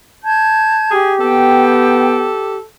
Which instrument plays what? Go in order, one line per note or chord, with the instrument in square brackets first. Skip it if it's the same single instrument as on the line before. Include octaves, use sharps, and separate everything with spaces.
[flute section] A5 G6 G#6
[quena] G4 [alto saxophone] G#4
[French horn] B3 [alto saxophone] A4 [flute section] G5